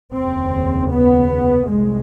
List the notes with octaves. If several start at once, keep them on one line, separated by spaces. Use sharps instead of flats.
F1 D#2 C#3 C4
B3
C2 A#2 G#3